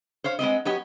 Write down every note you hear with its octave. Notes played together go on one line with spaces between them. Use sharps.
C5 C#5 F5
G#3 B3 C4 D#5
F#3 B3 G4 C#5 D#5